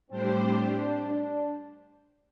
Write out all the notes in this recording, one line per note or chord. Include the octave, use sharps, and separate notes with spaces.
A2 G3 C4 D4 G4 C5
C4
D4
D4